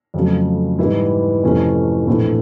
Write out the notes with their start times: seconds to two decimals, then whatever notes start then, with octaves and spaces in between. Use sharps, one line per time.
0.14 F2 C#3 F#3 A3
0.79 G#2 E3 G3 B3 E4
1.43 F2 C3 E3 A3 C#4
2.07 A#1 A2 E3 A3 C4